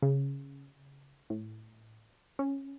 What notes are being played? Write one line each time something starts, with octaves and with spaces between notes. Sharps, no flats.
C#3
A2
C#4